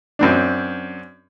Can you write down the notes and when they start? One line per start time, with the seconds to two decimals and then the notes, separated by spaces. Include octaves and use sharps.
0.19 F#2 C4 D4